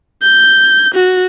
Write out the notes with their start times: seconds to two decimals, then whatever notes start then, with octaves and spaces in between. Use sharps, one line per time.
0.22 G6
0.94 F#4